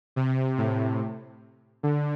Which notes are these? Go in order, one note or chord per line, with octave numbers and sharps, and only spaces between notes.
C3
A2
D3